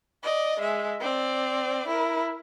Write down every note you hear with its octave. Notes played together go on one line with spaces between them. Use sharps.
D5 D#5
G#3 E5
C4 D5
E4 A#4